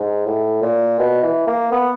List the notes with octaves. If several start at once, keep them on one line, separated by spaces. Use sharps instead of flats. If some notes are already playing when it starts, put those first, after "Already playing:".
Already playing: G#2
A2
A#2
B2
E3
A#3
B3